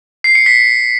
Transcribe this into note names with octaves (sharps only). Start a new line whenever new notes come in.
C7
C#7
B6